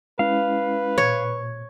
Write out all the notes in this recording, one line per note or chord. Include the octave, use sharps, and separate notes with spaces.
G#3 C#4 E4 B4 F5
A#2 C#5